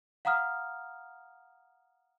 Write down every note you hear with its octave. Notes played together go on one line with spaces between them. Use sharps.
F5 F#5 A#5 D#6 F6